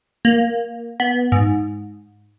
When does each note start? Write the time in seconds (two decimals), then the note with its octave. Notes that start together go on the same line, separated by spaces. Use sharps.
0.25 A#3
1.00 B3
1.32 G#2